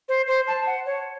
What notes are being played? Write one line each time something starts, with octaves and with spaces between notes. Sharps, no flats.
C5
C5
A5
F#5
C#5